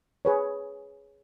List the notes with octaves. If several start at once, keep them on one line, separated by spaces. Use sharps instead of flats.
G#4 B4 C#5